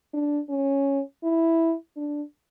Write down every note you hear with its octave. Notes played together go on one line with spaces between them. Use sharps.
D4
C#4
E4
D4